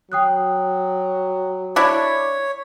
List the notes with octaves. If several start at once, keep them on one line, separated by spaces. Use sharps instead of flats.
F#3 G5 D#6 F#6
D4 E4 C#5 B6